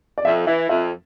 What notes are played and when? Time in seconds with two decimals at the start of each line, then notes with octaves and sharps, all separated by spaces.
0.18 D5
0.25 F2 E5
0.47 E3 E5
0.69 F2 E5